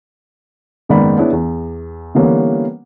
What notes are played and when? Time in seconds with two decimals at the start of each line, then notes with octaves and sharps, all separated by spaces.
0.89 F#1 G#2 D#3 B3 D5 B5
1.18 B3 C#4 D4 E4 G#4
1.32 E2
2.15 D3 E3 G3 A#3 B3 C#4